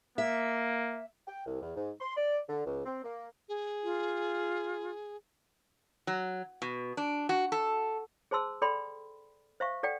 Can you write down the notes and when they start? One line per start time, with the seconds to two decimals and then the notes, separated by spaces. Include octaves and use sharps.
0.18 A#3 E5
1.28 G5
1.46 C2
1.62 E2
1.76 G#2
2.00 C6
2.16 D5
2.49 D3
2.66 C#2
2.85 C4
3.04 A#3
3.49 G#4
3.83 F4
6.07 F#3
6.62 B2
6.97 D4
7.29 F#4
7.52 A4
8.31 G#4 C5 A5 C6 E6
8.62 A4 D5 G5 B5 C6
9.60 C5 E5 F5 C#6
9.83 A4 D5 F#5 G5